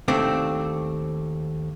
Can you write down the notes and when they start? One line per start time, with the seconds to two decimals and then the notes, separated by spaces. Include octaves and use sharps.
0.08 D#2 A3 C4 D4